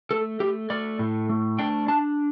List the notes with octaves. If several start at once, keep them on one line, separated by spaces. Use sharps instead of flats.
A3 A4
A3 G4
A3 D5
A2
A3
D4 G5
D4 A5